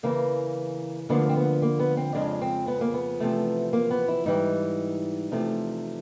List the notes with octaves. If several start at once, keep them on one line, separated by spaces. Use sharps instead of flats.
E2 C#3 E3 A#3
D2 D3 F3 A#3 B3
C4
B3
A#3
B3
C4
F2 C#3 F3 G#3 D4
C4
B3
A#3
B3
E2 C3 F3 A3
A#3
B3
E4
G#2 E3 G3 D#4
E2 C3 F3 A3